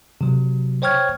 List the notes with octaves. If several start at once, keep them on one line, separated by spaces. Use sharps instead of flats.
C3 F#3
C5 C#5 G5 C#6 F6 G#6